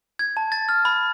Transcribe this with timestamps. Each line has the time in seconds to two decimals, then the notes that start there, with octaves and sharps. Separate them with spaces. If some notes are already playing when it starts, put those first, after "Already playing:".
0.19 G#6
0.37 A5
0.52 A6
0.69 F6
0.85 B5